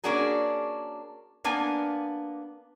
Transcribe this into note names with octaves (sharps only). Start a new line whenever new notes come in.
A#3 C#4 D4 F#4 G#4 A#4
A#3 B3 D4 G#5